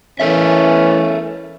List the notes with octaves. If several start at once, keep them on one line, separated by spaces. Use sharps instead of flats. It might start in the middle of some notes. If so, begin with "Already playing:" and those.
E3 C#4 A4 A#4 E5